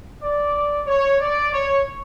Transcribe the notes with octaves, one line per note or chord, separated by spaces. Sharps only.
D5
C#5
D5
C#5